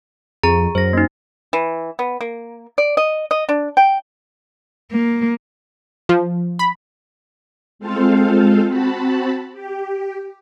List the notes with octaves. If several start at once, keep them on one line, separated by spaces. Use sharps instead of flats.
F2 G#4 A#5
F#2 C5 A#6
A#3 D#4
E3
B3
A#3
D5
D#5
D#5
D4
G5
A#3
F3
B5
G#3 C4 F4 A4 C5 F5
C4 F#4 A5 B5
G4